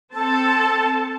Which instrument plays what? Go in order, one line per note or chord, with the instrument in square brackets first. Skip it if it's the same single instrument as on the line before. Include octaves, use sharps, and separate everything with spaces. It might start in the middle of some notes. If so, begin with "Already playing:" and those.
[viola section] C4 A5 [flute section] A4